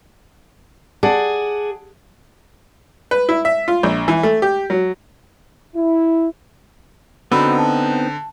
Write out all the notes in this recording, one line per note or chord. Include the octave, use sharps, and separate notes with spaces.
G#4 D5 F#5 A5
B4
E4
E5
F4
A#1
E3
A3
G4
F#3
E4
D3 B3 C4 D#4 F#4 B5 E6
A5